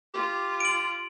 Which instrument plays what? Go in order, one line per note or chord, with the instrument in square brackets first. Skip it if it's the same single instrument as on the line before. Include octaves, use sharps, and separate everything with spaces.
[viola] F4 [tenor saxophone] G4
[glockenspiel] D7 F#7